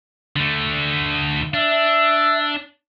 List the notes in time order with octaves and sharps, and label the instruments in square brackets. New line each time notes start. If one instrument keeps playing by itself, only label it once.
[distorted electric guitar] D3 A3
[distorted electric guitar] D4 [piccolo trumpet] E5